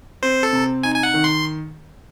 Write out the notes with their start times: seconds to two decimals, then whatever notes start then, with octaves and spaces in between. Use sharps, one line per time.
0.23 C4 C5
0.43 A4
0.53 C3
0.83 D#4 G#5
0.95 G#5
1.03 F#5
1.14 D#3
1.24 C6